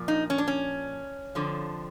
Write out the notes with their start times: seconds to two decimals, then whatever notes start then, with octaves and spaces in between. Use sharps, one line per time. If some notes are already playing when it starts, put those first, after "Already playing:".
Already playing: A#2 F3
0.08 D#4
0.30 C#4
0.38 D4
0.48 C#4
1.35 F2 D3 F3